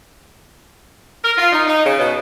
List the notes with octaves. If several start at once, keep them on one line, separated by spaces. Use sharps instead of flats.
A#4
F4
D#4
D#4
C#3
B2